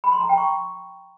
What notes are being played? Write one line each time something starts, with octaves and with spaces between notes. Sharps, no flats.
B5
C6
A#5
G5
C#6